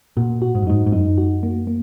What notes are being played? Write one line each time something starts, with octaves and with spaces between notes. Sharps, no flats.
A#2 F#4
F#4
G#2
F#2
G#2 D#4
G#2
F#2 D#4
F#4
A#3
A#3